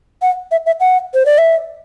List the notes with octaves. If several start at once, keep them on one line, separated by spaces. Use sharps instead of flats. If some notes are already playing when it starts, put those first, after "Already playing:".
F#5
E5
E5
F#5
C5
D5
E5